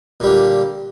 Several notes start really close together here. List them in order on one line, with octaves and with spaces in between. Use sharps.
A#2 G3 D3